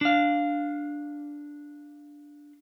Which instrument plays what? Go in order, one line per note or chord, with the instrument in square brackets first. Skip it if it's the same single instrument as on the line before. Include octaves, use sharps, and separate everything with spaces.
[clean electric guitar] D4 F5